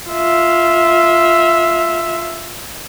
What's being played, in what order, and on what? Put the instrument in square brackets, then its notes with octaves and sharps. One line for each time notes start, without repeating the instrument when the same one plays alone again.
[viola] F4 E5